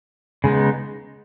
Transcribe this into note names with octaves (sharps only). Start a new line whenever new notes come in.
C#3 G#3 B3 D#4